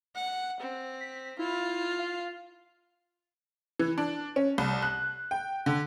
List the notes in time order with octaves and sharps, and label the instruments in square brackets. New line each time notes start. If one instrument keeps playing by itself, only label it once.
[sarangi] F#5
C4
[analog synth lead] B6
[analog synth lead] E4 [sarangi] F4
[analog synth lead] F5
[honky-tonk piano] E3
D4
C#4
C2
F#6
G5
D3